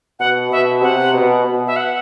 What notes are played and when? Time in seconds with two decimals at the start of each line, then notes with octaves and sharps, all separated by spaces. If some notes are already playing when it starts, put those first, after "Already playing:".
0.19 B2 F#5
0.51 B2 E5
0.82 C3 F#5
1.14 B2
1.45 B2
1.67 E5
1.76 F#5